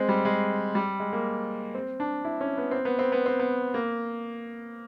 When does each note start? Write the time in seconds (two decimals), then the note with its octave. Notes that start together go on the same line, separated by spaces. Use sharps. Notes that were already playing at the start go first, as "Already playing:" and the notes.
Already playing: G#3 C4
0.09 G3
0.25 G#3
0.75 G3
1.00 G#3
1.13 A#3
1.75 C4
2.00 D4
2.25 E4
2.41 C#4
2.58 B3
2.71 C4
2.85 B3
2.99 C4
3.12 B3
3.26 C4
3.39 B3
3.74 A#3